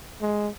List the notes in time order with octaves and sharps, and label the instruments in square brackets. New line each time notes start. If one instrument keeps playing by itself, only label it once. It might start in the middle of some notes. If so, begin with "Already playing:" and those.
[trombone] G#3